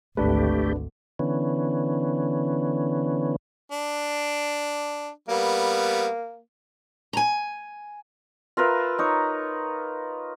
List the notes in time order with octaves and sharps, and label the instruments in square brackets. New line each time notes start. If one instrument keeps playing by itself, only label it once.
[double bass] G#1 D2 [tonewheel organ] A3 G4 [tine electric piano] D4 B4
[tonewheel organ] D3 E3 B3 C#4
[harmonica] D4
[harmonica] G3 B3 [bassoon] A#3
[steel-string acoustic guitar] G#5 A#5
[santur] F4 A#4 B4 E5
D#4 C#5